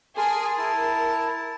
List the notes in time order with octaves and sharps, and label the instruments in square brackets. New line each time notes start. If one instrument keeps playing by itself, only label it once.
[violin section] G#4 [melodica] A#4 A5 C6
[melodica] E4 A5 [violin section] A#4